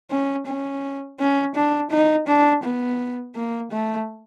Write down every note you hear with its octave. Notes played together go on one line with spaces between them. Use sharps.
C#4
C#4
C#4
D4
D#4
D4
B3
A#3
A3